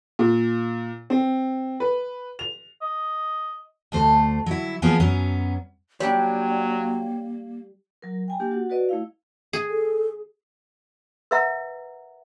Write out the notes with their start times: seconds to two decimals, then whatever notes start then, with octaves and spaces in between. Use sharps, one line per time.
0.19 A#2
1.10 C4
1.80 B4
2.39 F7
2.82 D#5
3.92 D2 A3 C5
4.46 F#3 E4
4.82 E3 F3 A#3 B3 G#4 C#5
5.00 F#2 F#3 B3 C#4
6.00 F#3 G3 A#3 D4 C#5 G5
8.02 F#3 A#4
8.28 G5 G#5 A#5
8.40 A#3 D4 G4
8.51 F#4 F#5
8.70 F#4 B4 D5 D#5
8.89 A3 E4 F5
9.53 G#4
9.69 A4
11.31 A#4 B4 E5 F#5 A#5